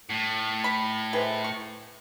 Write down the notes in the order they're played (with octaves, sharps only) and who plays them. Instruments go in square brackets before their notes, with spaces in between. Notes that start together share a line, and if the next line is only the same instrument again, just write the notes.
[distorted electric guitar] A2
[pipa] B5
C3 G#3 B4
C#6